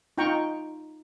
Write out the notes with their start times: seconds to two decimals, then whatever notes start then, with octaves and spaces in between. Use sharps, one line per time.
0.18 D#4 F4 G5 A#5 C#6